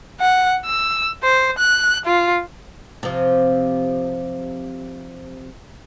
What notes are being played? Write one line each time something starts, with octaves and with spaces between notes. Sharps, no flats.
F#5
E6
C5
F#6
F4
C3 F3